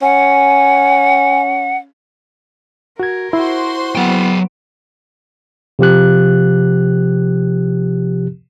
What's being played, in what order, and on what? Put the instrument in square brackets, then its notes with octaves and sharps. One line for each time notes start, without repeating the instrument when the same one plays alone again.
[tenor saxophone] C#4 [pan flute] F#5 [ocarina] G#5
[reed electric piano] F#4 G#6 [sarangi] A#4
[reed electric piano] E4 [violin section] F#4 C5 C6
[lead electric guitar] F#3 G5 [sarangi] B3
[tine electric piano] C3 F3 G4 F#6